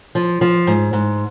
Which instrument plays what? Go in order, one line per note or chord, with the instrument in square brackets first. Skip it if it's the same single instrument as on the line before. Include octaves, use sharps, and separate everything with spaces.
[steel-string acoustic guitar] F3
F3
G#2
G#2